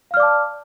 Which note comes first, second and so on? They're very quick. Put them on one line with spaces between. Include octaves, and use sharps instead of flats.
F5 F6 D5 D6 A5